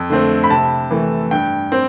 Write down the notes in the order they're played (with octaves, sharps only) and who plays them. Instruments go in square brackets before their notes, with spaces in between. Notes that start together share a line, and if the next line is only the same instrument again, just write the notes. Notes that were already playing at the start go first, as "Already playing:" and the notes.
Already playing: [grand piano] F2
D3 A3 C4
B5
C3 A5
E3 A3
G2 G5
C4